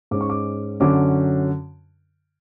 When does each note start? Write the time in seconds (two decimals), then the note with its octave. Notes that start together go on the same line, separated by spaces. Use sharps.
0.11 G#2 G#3 C#4 D6
0.21 C#6
0.30 D6
0.80 F#2 D3 F#3 C#4 D6